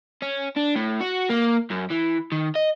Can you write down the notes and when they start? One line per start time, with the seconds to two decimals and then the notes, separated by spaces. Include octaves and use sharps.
0.22 C#4
0.57 D4
0.76 A2
1.01 F#4
1.29 A#3
1.70 F#2
1.90 E3
2.32 D#3
2.56 D#5